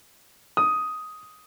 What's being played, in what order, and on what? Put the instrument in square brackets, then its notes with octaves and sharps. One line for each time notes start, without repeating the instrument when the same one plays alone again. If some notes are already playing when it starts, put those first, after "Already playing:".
[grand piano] D#6